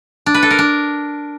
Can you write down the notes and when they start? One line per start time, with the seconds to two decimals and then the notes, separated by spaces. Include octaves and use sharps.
0.26 D4
0.34 B4
0.42 A4
0.51 A#4
0.59 D4